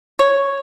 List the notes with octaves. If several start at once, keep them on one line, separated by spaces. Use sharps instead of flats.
C#5